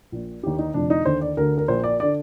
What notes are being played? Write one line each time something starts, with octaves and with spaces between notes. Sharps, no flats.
A#1 A#2
D#2 D3 G4
D#4
F1 F2 D3 D4
D#4
D#2 D3 C5
D5
D2 D3 A#4
A#4
A#1 A#2 C5
D5
D3 D5